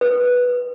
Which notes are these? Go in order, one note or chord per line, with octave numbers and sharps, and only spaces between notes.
B4